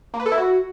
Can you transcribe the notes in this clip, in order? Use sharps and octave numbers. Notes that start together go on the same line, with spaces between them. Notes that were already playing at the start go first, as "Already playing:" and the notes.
A#3
B4
A4
E4
F#4